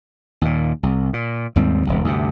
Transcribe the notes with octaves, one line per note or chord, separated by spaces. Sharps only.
D#2 A#2
C2
A#2
D#2 G#2 G3 C4
E1 C#2
D2 G2 C3